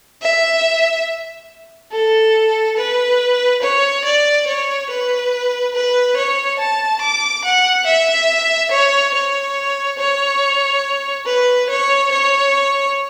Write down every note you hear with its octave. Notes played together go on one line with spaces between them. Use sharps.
E5
A4
B4
C#5
D5
C#5
B4
B4
C#5
A5
D6
F#5
E5
C#5
C#5
C#5
B4
C#5
C#5